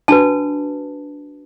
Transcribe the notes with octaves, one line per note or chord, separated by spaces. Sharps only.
D4 F#4 B4 A5